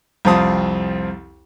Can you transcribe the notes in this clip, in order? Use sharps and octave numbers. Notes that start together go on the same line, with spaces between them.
C2 F2 C4 F4 A5 D#6